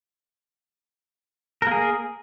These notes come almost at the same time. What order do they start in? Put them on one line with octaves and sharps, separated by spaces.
A#4 A#3 G#4